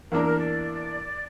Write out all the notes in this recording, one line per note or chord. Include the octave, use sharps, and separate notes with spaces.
E2 E3 A#3 D4 A#4
D5